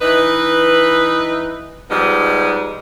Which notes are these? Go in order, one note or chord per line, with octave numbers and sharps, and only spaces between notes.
E3 D#4 B4
F3 G3 G#3 B3 D#4